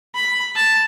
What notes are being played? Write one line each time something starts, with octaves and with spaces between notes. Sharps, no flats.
B5
A5